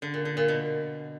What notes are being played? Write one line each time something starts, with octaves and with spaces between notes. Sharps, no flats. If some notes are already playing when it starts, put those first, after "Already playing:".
D3
A#2
D3
A#2
B2